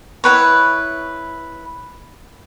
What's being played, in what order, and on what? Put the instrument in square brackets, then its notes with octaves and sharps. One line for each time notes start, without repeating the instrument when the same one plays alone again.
[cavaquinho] E4 F4 B4 C#5